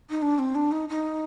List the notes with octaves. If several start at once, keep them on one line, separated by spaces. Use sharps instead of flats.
D#4
D4
C4
D4
D#4
D#4